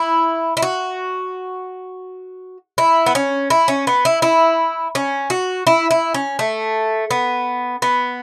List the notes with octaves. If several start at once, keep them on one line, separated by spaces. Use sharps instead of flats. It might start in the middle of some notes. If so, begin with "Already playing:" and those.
Already playing: E4
E4
F#4
E4
B3
C#4
E4
C#4
B3
E4
E4
C#4
F#4
E4
E4
C#4
A3
B3
B3